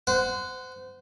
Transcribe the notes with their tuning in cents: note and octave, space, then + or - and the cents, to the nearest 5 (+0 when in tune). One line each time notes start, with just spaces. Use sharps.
C5 -30 F#5 +0